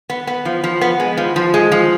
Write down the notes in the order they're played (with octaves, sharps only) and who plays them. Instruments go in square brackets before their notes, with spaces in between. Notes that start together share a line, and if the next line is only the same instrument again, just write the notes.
[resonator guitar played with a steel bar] B3
B3
F3
F3
B3
G#3
F3
F3
G#3
F3